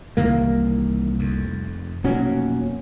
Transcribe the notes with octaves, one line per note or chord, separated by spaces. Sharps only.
C2 C3 D#3 E3 A#3
F1 F2
F1 B2 F#3 A#3 C#4